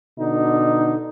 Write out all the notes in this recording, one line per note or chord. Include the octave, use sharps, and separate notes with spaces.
B2 D3 D#4